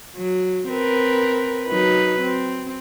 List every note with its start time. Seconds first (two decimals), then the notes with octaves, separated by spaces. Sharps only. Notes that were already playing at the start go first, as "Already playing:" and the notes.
0.16 F#3
0.69 C4 A#4 B4
1.68 F#3 D#4 B4
2.21 C4